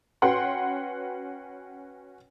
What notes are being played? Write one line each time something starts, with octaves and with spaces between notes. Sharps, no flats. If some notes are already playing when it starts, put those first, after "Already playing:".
C#4 F#4 B4 F#5 G5 C6